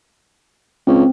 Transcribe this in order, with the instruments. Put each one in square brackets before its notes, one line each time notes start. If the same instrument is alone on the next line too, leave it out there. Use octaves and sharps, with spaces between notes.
[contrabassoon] C#2 [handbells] C4